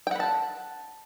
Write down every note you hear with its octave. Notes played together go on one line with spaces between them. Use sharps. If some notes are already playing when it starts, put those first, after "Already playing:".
F#5 G5 A5 B5